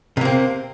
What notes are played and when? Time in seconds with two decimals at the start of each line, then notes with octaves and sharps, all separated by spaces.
0.17 C3
0.21 A#3
0.25 C4